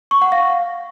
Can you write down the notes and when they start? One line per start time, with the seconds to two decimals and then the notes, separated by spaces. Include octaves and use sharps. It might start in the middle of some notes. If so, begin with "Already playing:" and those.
0.11 C#6
0.22 F#5
0.32 F5